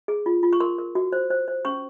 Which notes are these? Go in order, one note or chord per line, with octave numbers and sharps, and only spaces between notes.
G#4
F4
F4
C#6
A#4 C6
A#4
F#4
C5
C5
C5
C#4 C#6